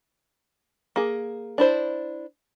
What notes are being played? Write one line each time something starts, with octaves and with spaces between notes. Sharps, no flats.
A#3 G#4
D4 E4 C5